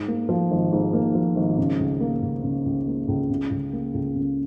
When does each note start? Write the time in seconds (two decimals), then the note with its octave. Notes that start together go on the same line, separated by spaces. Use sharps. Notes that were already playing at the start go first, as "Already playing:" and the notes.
Already playing: G#2
0.08 A#3
0.29 F3
0.51 G#1
0.72 G#2
0.93 A#3
1.15 F3
1.36 G#1
1.58 C#3
1.79 C#2
2.00 A#3
2.22 C#2
2.44 C#3
2.66 C#2
2.87 A#3
3.08 C#2
3.30 C#3
3.51 C#2
3.73 A#3
3.94 C#2
4.15 C#3